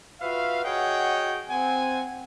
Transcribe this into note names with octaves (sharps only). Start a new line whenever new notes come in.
F4 F#4 B4 E5 F5
F#4 G#4 C#5 D#5 F#5 G5
C4 F#5 G#5